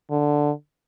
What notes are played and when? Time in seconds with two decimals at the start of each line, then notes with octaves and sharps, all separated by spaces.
0.10 D3